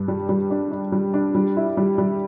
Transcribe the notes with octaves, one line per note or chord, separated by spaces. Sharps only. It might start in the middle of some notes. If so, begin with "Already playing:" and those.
Already playing: G2 D4
G3
G3
D4
D4
G3
D4
G3
E4
G3
G3